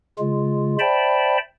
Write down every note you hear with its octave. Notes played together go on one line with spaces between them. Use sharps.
C#3 G#3 F4
C5 D5 E5 G5 A5 B5